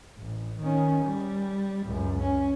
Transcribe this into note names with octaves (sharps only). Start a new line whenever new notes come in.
A1
D#3 C#4
G3
C#2 F#2
C#4